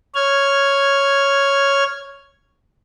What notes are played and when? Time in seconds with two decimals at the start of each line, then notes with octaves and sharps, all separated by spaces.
0.15 C#5 F6 G#6